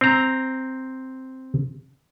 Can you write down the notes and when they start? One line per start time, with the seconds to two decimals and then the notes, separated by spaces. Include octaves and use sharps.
0.01 C4 A#5